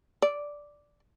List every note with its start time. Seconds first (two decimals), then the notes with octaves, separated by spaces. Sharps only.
0.22 D5